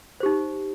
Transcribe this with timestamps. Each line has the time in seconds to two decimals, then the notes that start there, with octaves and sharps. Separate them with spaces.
0.20 C5
0.23 G4
0.26 D#4